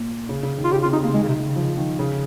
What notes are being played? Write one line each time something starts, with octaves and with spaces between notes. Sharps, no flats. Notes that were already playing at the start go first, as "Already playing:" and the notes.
Already playing: A#2
C#3
C#3
D#3
F4
C#3 G4
F4
C3
D#4
C#3 A#3
D#3 G#3
C#3
C3
C#3
F3
D#3
C#3